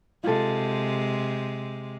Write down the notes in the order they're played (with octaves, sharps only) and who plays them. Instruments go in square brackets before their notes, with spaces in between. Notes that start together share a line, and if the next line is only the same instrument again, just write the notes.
[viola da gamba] C3 G#3 [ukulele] F4 A4